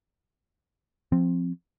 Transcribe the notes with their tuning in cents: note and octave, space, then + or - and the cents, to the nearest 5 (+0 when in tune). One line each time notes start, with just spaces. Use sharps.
F3 +0 C4 +0